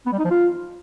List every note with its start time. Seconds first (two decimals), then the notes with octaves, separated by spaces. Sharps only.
0.06 B3
0.12 G3
0.19 D#4
0.25 F3
0.31 F4